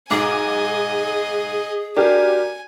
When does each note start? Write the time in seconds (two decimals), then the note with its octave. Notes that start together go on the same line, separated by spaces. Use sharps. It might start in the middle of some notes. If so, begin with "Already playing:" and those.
0.10 B1 G#2 G#4 D#5 G#5 D6
1.97 D4 F#4 G4 A#4 D5 G#5